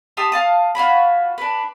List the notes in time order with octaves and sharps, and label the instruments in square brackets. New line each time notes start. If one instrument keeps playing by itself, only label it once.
[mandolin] G4 A5 C6 D#6
F5 A5 D#6
F4 F#4 C#5 B5
D4 B4